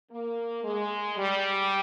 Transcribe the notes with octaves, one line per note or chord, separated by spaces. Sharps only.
A#3
G#3
G3